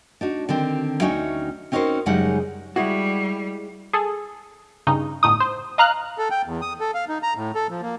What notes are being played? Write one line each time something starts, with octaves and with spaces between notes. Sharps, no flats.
D4 D#4 F#4
D3 D#3 C4
D2 C#4 D#4 F#4 E5 G5
C4 C#4 D#4 F#4 A#4 C5
F#2 C#3 G3 G#3 D#4 F#5
G3 G#3 E4 F#4
G#4 A4
G2 C#3 D#4
G1 A2 D#4 D#6
C5
D#5 F5 A#5 F6 F#6
A4
G5
E2
D#6
A4
F5
D#4
A#5
A2
A4
F3
A#3